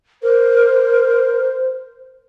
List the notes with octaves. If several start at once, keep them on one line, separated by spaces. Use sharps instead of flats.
A#4 C5